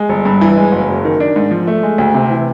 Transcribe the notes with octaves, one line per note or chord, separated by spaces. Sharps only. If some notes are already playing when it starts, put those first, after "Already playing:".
Already playing: G#3
G1
G2
E3
G#3
F#1
F#2
D#3
D4
G#2
F3
A3
G#3
D2
C3
E3